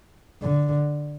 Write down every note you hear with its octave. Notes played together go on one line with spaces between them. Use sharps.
D3